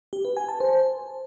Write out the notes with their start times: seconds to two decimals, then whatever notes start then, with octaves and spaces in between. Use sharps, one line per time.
0.13 G4
0.25 B4
0.37 G#5
0.49 A5
0.60 C5